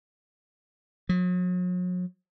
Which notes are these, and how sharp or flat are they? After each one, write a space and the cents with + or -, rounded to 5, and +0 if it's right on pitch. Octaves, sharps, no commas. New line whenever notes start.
F#3 -40